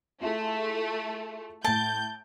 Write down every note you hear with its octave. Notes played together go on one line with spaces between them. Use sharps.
A3 E4 F4 G#4
A2 A5 G6 D7